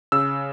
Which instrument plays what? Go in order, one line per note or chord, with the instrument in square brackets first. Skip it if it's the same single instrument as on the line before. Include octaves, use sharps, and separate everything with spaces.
[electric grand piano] C#3 E6